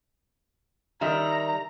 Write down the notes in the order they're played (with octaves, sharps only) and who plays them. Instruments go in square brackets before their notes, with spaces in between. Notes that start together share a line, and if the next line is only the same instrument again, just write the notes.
[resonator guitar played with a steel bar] D#3 G3 E5 [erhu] A#5